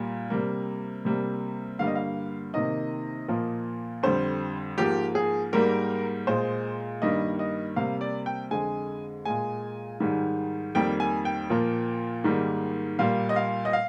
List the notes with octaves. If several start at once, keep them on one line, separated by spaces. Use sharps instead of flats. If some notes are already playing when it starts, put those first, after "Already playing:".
Already playing: A#2 G3 A#3
C3 G3 A#3
C3 G3 A#3
G2 D3 G3 A#3 F5
D#5
F5
C3 D#3 A#3 D#5
A#2 F3 A#3
F2 D3 G3 C5
G#2 F3 A#3 G4
G#4
G#2 G3 A#3 A#4
A#2 G#3 C5
G2 D#3 G3 A#3 D#5
D#5
C3 G3 A#3 F5
D5
G5
F2 D3 G#3 G#5
A#2 G#3 G#5
G#2 D#3 G3
F2 D#3 G3 A#3 G5
G#5
G5
A#2 F3 A#3
G#2 D#3 G3 A#3
A#2 G3 A#3 F5
D#5
F5
D#5
F5